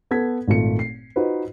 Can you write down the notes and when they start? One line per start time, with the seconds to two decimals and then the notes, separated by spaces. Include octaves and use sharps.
0.11 B3 A4 G#6 B6
0.48 G#1 A#2 A3 F4 C#7
0.79 C7
1.16 D#4 F4 F#4 B4 C5